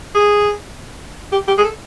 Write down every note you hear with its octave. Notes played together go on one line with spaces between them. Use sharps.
G#4
G4
G4
G#4
A4